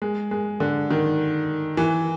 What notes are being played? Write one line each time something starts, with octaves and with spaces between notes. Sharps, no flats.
G#3
G#3
D3
D#3
E3